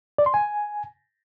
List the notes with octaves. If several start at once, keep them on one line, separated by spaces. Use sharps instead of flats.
D5
C6
G#5